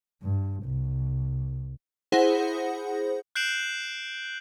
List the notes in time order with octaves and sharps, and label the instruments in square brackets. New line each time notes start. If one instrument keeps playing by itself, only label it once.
[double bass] G2
C2
[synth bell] E4 G#4 C5 F#5 A#6
[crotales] F#6 G6 C7 D7 E7 F#7